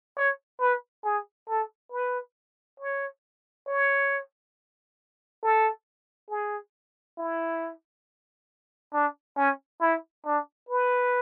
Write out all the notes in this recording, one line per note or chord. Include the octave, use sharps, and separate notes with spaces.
C#5
B4
G#4
A4
B4
C#5
C#5
A4
G#4
E4
D4
C#4
E4
D4
B4